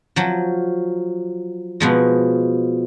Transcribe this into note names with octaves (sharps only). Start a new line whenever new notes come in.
F3 F#3
B2 F3 G#3